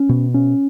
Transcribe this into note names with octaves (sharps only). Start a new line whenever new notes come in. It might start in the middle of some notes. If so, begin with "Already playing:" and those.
Already playing: C#4
B2
C#4